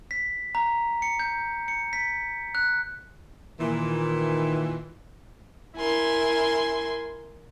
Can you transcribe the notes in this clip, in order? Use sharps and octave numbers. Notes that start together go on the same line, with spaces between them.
B6
A#5
C#7
G6
C#7
B6
F#6
A#2 D#3 E3
E4 A#4 G#5 C6